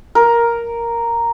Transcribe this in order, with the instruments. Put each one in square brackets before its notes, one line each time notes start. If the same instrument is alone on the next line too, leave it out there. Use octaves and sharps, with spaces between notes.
[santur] A#4